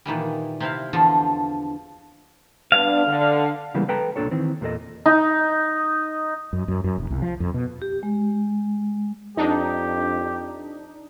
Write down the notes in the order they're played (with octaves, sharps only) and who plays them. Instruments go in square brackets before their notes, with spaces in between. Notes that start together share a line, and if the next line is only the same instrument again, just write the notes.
[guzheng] A#2 D#3 E3 G3
C3 C4 E4 F5
E2 D3 F3 A4 A5
[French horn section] G2 B3 D4 [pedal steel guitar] F5
[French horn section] D3
[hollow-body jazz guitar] C#3 E3 G3 G#3 A#3 B3
A4 B4 G5 A5 A#5
C2 A#2 F#3 D4 A4 C#5
D#3 E3 C4
E2 A#2 A#3 A4 D#5
[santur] D#4
[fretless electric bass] F#2
F#2
F#2
E1
C2
F3
F2
B2
[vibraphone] G4
G#3
[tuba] F2 [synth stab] D4 D#4 [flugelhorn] G4